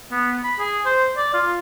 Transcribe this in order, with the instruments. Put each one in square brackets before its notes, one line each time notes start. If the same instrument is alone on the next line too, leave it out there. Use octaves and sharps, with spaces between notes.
[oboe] B3
B5
G#4
C5
D5
F4